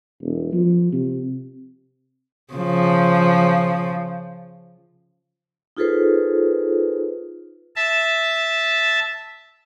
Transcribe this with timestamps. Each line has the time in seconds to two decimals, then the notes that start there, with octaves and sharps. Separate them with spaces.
0.22 E1
0.53 F3
0.93 C3
2.54 C#3 F3
5.77 D#4 F4 G#4 A4 B4 C5
7.76 E5 A5